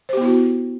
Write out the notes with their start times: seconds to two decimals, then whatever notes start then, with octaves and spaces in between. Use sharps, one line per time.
0.09 C5
0.13 G4
0.17 B3
0.21 E4
0.25 F#4